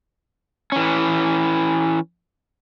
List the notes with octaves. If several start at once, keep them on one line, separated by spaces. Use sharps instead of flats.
E3 C#4